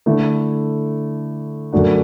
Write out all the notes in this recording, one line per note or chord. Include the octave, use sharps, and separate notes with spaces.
D3 A3 E4
F#2 D3 A3 D4 F#4